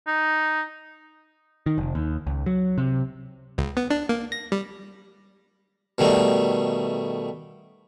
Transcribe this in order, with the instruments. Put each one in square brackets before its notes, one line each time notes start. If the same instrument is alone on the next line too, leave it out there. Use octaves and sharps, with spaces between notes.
[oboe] D#4
[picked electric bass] D#3
F1
D#2
C#2
F#3
C3
[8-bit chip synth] C#2
B3
D4
A#3
A#6
G3
[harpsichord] B2 D#3 G3 A3